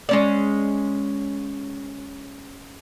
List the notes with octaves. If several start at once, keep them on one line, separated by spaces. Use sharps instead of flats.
G#3 C#4 D5